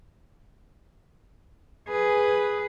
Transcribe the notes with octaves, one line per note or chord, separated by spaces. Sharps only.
G#4 B4